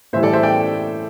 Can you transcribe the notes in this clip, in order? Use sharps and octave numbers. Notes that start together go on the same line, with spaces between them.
A2 E3 G3 C5 E5
A4 D5
C5 E5
D5 G5